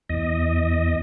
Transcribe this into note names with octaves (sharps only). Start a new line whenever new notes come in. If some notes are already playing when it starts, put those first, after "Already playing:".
E2 D#5